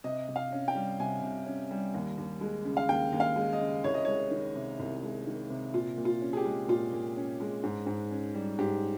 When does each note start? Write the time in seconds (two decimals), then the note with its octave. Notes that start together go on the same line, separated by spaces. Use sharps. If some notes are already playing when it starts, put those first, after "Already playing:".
0.04 C3 D#5
0.28 C3
0.36 F5
0.52 C#4
0.68 G5
0.75 G3
1.00 C3 G#5
1.22 C3
1.46 C#4
1.71 G3
1.94 D#2
2.18 D#2
2.41 G#3
2.65 C#3
2.77 F5
2.89 D#2 G5
3.13 D#2
3.20 F5
3.36 G#3
3.53 D#5
3.60 C#3
3.84 C2 C#5
3.94 D#5
4.05 G#3 C#5
4.31 D#3
4.55 C3
4.79 C2
5.03 G#3
5.27 D#3
5.50 C3
5.74 A#2 F4
5.97 A#2
6.05 F4
6.21 C#4
6.33 G#4
6.37 G4
6.45 G#3
6.68 A#2 F4
6.93 A#2
7.17 C#4
7.40 G#3
7.63 G#2
7.87 G#2
8.11 C#4
8.35 G3
8.59 G#2 G4